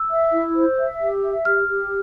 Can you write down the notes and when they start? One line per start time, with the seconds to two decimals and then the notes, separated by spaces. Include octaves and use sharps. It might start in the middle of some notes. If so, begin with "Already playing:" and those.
Already playing: E6
0.09 E5
0.32 E4
0.55 C5
0.78 E5
1.00 G4
1.22 E5
1.45 G4 F6
1.67 G4